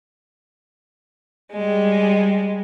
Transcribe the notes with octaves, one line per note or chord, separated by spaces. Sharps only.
G3 G#3